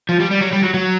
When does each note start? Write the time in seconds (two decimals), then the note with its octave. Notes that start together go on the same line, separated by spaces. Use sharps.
0.09 F3
0.20 G3
0.31 G3
0.41 F#3
0.53 G3
0.63 F#3
0.74 F#3